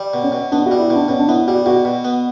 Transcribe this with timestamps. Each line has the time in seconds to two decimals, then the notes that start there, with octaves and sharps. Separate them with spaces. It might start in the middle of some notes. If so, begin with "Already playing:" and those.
Already playing: G3
0.14 B2
0.23 C#4
0.32 B2
0.52 B3 D4
0.66 F#4
0.71 G3
0.80 E4
0.90 B2 D4
1.08 B2 C#4
1.19 D4
1.28 B3 E4
1.48 G3 F#4
1.66 B2 F#4
1.85 B2
2.05 B3